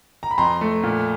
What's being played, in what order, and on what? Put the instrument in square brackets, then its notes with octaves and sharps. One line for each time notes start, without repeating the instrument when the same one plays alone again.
[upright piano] A#5
B5
F2 A#5 C6
A3
A#2